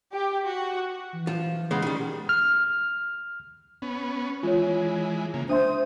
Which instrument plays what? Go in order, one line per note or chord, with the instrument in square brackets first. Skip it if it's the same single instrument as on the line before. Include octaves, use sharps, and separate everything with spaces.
[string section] G4
F#4
[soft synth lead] E3
[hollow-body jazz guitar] F3
C#3 G#3 B3
D#3 G3
[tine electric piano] F6
[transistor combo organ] B3 C#4
[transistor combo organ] E3 G#3 [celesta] F4 C#5
[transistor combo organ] C#3 A#3
[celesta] D4 E5 C6 [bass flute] C5 [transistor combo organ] D#6